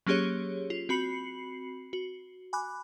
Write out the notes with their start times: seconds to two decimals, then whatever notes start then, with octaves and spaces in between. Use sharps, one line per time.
0.07 F#3 A#3 C#4 G4 G#4 C#5
0.70 F4
0.89 C4 F#4 B5 C7 C#7 F#7
1.93 F#4
2.53 G#5 B5 D6 F#6